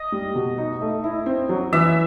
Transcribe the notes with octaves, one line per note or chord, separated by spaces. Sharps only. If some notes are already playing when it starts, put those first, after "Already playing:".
Already playing: D#5
G3
B2
D#4
A3
E4
C4
F#3
E3 E5